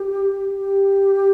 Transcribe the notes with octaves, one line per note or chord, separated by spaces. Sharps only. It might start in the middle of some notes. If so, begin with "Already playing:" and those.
Already playing: G4
G4